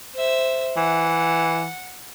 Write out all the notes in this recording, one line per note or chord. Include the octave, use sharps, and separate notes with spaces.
C5 E5
E3 F#5